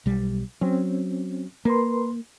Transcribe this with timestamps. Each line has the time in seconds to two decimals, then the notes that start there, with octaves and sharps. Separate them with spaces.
0.06 B1 G3
0.61 F#3 C4 C#4
1.65 A#3 A#4 B4 C6